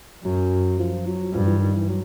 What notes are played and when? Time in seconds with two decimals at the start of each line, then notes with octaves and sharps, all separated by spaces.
0.24 F#2 F#3
0.79 F3
1.06 F#3
1.34 G2 F3
1.47 E3
1.61 D#3
1.74 E3
1.89 F#3